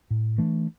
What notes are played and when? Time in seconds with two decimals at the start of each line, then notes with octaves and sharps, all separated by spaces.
0.10 A2
0.38 E3 A3 D4